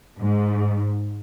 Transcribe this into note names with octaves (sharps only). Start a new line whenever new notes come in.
G#2